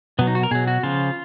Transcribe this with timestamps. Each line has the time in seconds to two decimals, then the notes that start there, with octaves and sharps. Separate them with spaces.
0.19 B2 F#3 B3
0.27 D#4
0.35 F#4
0.43 A#4
0.51 B2 F#3 G#4
0.67 F#4
0.83 C#3 F3 F4